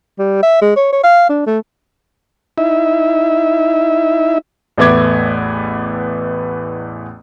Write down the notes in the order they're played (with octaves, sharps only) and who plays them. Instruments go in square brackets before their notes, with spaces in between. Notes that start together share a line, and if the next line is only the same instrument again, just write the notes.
[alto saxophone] G3
E5
G#3
C#5
C#5
F5
D4
A3
[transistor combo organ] D#4 E4 E5
[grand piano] A1 E2 A3 B3 D6 G#6